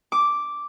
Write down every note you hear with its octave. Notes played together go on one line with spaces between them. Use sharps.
D6